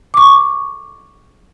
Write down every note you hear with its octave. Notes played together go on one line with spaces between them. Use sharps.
C#6 D6